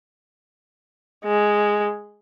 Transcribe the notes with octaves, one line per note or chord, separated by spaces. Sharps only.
G#3